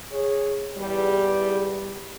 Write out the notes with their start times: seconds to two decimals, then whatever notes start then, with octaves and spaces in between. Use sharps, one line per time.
0.11 G#4 C#5
0.76 E2 G3